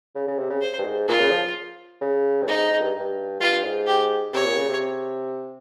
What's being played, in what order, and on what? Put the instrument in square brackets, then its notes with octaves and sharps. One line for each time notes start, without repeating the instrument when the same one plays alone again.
[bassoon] C#3
C#3
C3
C#3
[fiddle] C5
[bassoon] G2
G#2
[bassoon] A#2 [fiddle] F4
[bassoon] C#3
F3
C#3
G2
[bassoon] G#2 [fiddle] D#4
[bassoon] G#2
G2
G2
[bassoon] G2 [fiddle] F4
[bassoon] G#2
[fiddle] G4
[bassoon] C3 [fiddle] C#5
[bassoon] A#2
C#3
C3